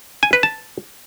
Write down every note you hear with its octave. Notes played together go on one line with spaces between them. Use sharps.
G#5
B4
A5